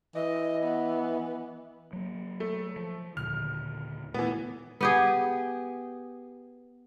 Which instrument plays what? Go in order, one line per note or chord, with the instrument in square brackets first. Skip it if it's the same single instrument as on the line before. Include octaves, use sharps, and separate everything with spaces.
[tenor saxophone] E3 [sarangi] D#5
[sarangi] B3
[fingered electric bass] F#3 A#3
[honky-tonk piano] A3
[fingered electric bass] F3
[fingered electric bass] D#2 A#2 D3 [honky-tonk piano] F6
[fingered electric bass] A#2 A3 [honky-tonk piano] E3 B3
[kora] B3 G4 G#4